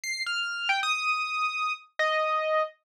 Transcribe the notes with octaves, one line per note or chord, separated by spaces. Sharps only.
C7
F6
G5
D#6
D#5